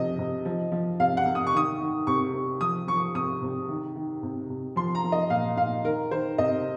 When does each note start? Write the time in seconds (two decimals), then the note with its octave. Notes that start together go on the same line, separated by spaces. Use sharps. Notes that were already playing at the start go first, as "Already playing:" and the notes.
Already playing: C3 F3 D#5
0.19 C3
0.45 F3
0.72 F3
1.00 C3 F5
1.17 F#5
1.26 C3
1.35 D#6
1.47 C#6
1.53 D#3 D#6
1.80 D#3
2.07 C3 C#6
2.34 C3
2.61 F3 D#6
2.87 F3 C#6
3.14 C3 D#6
3.42 C3
3.69 D#3
3.96 D#3
4.23 C3
4.50 C3
4.76 F3 C6
4.95 A#5
5.04 F3
5.12 D#5
5.30 A#2 F5
5.57 A#2 F5
5.85 D#3 A#4
6.11 D#3 C5
6.38 C3 D#5